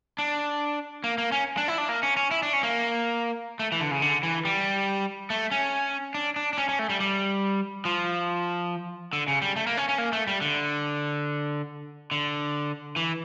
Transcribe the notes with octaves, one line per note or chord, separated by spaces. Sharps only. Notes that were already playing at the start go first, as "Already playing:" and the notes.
D4
A#3
A#3
C#4
D4
E4
D4
A#3
C#4
C#4
E4
D4
C#4
A#3
A3
E3
D3
C#3
D3
E3
G3
A3
C#4
D4
D4
D4
C#4
C#4
A3
G3
G3
F3
D3
C#3
G3
A3
A#3
C#4
C#4
A#3
A3
G3
D3
D3
E3